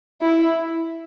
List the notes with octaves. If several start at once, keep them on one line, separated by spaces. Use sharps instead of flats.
E4